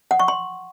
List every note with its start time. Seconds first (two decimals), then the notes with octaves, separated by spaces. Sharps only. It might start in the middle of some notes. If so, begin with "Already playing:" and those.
0.11 F#5
0.20 C#6
0.28 C6